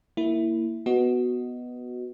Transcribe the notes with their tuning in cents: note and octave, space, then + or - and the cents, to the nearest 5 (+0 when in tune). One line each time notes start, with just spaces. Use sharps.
A#3 -15 E4 +0
B3 +0 F#4 +0 D#5 +0